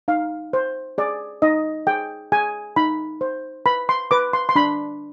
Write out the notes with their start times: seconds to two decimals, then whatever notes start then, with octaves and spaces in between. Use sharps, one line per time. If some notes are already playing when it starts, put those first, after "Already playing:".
0.08 D#4 F5
0.53 C5
0.98 G#4 D5
1.42 D#4 D#5
1.87 G#4 G5
2.32 G#4 G#5
2.76 D#4 B5
3.21 C5
3.66 B4 B5
3.89 C6
4.11 B4 D6
4.33 C6
4.49 C6
4.56 D4 B5